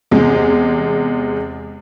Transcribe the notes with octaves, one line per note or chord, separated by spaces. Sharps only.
E2 C3 G#3